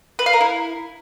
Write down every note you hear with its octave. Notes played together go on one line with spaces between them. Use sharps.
B4
F5
A#4
E4